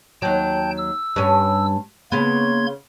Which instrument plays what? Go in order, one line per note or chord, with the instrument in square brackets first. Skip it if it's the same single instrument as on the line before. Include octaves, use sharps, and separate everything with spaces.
[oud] D#2 F#3 [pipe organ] G5 A5 G6
[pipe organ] E6
[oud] G2 C#4
[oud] C#3 B3 [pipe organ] A#3 C6 G#6